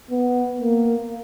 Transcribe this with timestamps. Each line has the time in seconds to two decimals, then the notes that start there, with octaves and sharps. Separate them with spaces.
0.10 B3
0.60 A#3